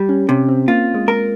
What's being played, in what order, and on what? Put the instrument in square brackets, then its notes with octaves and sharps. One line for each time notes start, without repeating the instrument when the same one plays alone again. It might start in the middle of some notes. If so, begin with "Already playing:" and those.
Already playing: [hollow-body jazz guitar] G3
[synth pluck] C#4
[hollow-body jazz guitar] C3 [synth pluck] C#4
[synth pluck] C4
[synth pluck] A#3 [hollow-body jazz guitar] F4
[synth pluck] G#3
[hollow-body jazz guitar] A#4